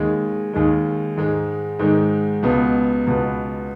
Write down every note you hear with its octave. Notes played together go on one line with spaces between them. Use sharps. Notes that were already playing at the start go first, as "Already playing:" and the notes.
Already playing: D#2 D#3 G#3
D#2 D#3 G#3
G#2 D#3 G#3
G#2 D#3 G#3
C#2 B2 B3
C#2 B2 B3